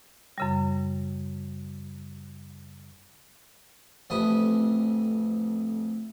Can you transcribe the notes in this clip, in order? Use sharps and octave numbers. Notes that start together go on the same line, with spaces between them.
F#2 C#3 G3
A1 F2 B3 E4 G4 D#6